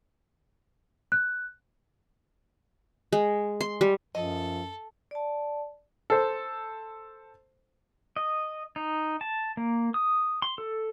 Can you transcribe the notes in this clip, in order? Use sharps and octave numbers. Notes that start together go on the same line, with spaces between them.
F#6
G#3
C6
G3
F#2 F3 A4 D#5
D5 A5
A4 C5
D#5
D#4
A5
A#3
D#6
C6
A4